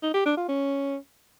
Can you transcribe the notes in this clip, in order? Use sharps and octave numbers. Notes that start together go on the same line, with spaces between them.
D#4
G4
D4
F4
C#4